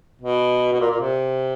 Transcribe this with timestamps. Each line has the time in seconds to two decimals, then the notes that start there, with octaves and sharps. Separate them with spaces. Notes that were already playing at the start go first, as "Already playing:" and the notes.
0.21 B2
0.73 B2
0.80 A#2
0.91 A#2
1.00 C3